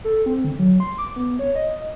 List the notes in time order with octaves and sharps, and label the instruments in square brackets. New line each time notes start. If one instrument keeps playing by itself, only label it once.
[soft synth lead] A4
C4
D3
F#3
C6
D6
B3
C#5
D#5